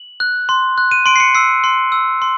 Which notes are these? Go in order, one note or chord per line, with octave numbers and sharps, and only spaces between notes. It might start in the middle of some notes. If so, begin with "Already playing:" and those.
Already playing: F#7
F#6
C6
F#6
D#7
C6 D7
C7
C#7
E6 C7
C6
E6
C6